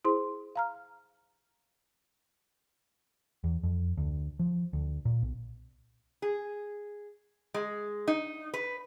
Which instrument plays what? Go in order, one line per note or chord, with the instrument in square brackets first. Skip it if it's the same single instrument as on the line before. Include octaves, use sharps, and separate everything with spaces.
[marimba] E4 G#4 C5 C6
F5 A#5 F6
[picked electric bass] E2
F2
D2
F3
D2
A#2
B1
[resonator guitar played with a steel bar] G#4
G#3
D#4
B4